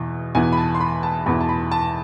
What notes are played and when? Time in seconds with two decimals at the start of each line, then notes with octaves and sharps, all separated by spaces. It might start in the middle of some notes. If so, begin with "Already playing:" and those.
Already playing: E2 B2 E4
0.35 E2 B2 B3 E4 G#5
0.53 B5
0.57 A5
0.75 C6
0.81 B5
1.03 A5
1.26 E2 B2 B3 E4 B5
1.41 A5
1.49 B5
1.72 A5